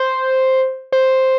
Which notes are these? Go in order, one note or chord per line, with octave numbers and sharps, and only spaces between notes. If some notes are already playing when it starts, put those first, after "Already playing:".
Already playing: C5
C5